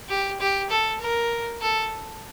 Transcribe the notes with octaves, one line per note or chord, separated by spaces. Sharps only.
G4
G4
A4
A#4
A4